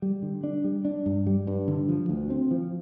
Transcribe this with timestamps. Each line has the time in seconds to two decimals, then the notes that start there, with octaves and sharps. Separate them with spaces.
0.02 G3
0.22 D3
0.44 D4
0.64 G3
0.85 D4
1.06 G2
1.27 G3
1.47 G2
1.68 D3
1.89 F3
2.09 D2
2.30 C4
2.51 F3